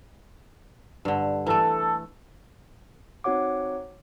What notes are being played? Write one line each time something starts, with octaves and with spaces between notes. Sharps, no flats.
G2 D3
E3 A3 A4
C4 D#4 F#4 C#5 F#5 D6